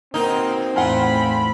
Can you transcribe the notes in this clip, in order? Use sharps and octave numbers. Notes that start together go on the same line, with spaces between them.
B2 A#3 C4 D#4
E2 A2 F4 F#5 G#5 B5